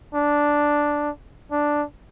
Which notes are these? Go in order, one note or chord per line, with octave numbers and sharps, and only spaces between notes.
D4
D4